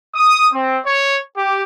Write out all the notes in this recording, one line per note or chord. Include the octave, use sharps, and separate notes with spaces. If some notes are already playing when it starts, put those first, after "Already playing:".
D#6
C4
C#5
G4